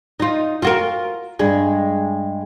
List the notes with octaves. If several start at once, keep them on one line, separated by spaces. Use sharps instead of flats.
D#4 F4
F4 F#4 A#4
G2 G#3